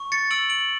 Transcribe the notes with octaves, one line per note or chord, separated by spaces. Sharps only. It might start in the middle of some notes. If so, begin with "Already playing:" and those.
Already playing: C#6
A6 C#7
E6 D7 F#7
D7 F#7